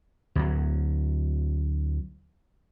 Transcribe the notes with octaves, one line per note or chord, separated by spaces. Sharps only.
D2 F#3